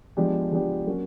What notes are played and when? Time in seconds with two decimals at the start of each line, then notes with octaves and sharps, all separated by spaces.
0.17 F3 G#3 B3 D4 G4
0.52 F3 G#3 B3 D4 G4
0.86 F#3 A#3 C#4 F#4